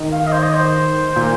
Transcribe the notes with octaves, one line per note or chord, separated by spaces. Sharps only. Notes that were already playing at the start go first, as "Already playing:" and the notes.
Already playing: D#3
F5
D#5
C5
D#5
C5
A#2